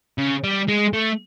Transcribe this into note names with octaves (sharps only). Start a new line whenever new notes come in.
C#3
G3
G#3
A3